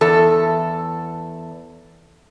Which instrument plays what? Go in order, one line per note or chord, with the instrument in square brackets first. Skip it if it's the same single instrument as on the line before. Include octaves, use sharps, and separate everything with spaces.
[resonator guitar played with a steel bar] E2 A4